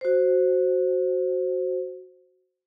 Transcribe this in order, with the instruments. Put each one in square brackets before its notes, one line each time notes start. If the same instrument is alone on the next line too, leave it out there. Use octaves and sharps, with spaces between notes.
[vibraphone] F#4 C5